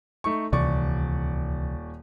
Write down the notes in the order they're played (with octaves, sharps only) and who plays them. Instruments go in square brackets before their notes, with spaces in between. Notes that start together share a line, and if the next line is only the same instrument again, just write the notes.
[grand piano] A3 D#4 C#6
[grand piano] D#1 D5 C#6 [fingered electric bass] C#2 C3 E3